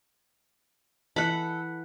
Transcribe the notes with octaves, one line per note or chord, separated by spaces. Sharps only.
E3 A4 F#5 B5